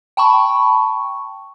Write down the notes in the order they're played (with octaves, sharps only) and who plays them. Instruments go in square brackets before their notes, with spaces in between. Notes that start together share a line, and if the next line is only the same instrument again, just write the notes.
[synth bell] G5 A5 B5 C#6